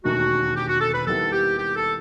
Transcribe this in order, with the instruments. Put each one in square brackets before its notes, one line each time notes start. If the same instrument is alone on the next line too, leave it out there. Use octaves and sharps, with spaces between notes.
[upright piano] E1 D#2 D#3 A3 D#4 [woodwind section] F#4
[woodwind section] G4
F#4
A4
B4
[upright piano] D#2 D#3 G3 B3 E4 [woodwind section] A4
[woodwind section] G4
G4
A4